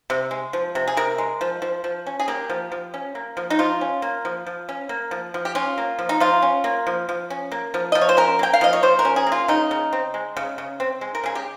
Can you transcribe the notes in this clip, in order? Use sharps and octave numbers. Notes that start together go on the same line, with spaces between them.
C3
G#3
F3
C3
G#4
C3 A#4
G#3
F3
F3
F3
C#4
G#4
A#3 G4
F3
F3
C#4
A#3
F3
D#4
F3 F4
C#4
A#3
F3
F3
C#4
A#3
F3
F3
G4
C#4 F4
A#3
F3
D#4
F3 F4
C#4
A#3
F3
F3
C#4
A#3
F3
F3 D#5
C#5
C5
C#4 A#4
A#3 G5
F5
F3 D#5
C#5
F3 C5
A#4
C#4
G#4
A#3
F4
C#3 D#4
C#3
C4
G#3
C#3
C#3
C4
G#3
A#4
C#3 G#4
G4